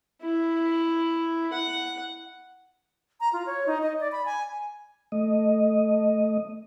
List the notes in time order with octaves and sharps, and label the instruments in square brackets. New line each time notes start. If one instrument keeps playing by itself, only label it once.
[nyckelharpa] E4
F#5
[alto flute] A#5
F4
C#5
D#4
D#5
D5
B5
G#5
[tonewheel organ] A3 D#5